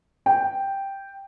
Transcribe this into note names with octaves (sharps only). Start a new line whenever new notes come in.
G5